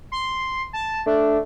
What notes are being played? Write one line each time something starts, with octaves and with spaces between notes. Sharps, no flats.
C6
A5
A3 D4